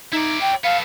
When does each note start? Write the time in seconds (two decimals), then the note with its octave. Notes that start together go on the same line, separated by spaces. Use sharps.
0.12 D#4 E4 D5
0.41 G5
0.64 B3 A4 F5